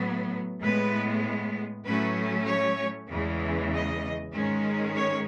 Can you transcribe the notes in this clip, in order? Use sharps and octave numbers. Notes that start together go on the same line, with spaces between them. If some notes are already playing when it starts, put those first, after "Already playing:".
Already playing: A2 F#3 B3
A2 G#3 B3 B4
A2 F#3 A3 C#4 B4
C#5
E2 C#3 E3 G#3
D#5
G#2 D#3 G#3 C#4
C#5